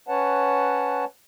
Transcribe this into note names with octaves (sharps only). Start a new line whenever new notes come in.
C#4 B4 C#5 F#5 A5